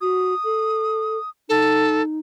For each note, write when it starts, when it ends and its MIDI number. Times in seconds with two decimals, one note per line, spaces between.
0.01 0.34 66
0.01 1.30 87
0.45 1.18 69
1.49 2.19 63
1.49 2.02 69